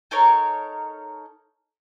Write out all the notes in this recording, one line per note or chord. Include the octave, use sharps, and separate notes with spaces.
D#4 A4 A#4 C#5